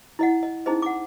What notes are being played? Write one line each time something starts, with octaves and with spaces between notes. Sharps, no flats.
E4 D#5 F#5
D#5
C#4 D#4 E4 G#4 C5 D#5
F#5 D6